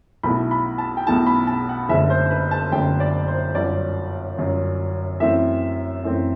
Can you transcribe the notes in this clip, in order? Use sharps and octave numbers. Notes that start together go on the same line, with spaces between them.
B1 B2 A3 E4 B5
B5
A5
G5
B1 B2 A3 E4 A5
B5
A5
F#5
F#1 F#2 D3 A3 E5
C5
B4
A5
F#1 F#2 D3 A3 G5
D5
C5
G1 F#2 F#3 D5
G1 F#2 F#3
F#2 E3 A3 C4 E5
F#2 E3 A3 C4